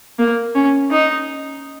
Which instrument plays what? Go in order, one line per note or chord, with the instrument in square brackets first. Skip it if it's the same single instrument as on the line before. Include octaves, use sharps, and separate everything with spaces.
[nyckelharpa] A#3
C#4
D#4